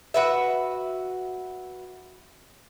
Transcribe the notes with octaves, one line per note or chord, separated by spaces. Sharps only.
F#4 B4 E5